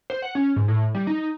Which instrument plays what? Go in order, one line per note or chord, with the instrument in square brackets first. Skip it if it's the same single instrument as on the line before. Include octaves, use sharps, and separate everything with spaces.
[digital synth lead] C5
F#5
C#4
G#2
A2
G3
D#4